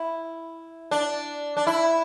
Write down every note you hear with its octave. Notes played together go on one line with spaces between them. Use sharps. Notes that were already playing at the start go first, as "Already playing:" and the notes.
Already playing: E4
D4
D4
E4